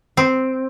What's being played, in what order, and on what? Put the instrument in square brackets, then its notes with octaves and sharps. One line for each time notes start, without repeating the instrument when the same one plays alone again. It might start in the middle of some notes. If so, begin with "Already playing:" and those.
[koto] C4